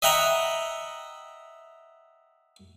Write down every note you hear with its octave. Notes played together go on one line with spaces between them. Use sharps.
D#5 E5 F#5 G5 A#5 B5